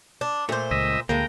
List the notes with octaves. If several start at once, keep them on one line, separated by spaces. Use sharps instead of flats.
D4
A#2 A3 C5
C#2 D#5 E5
D2 A2 G#3 A#3 G5 A#5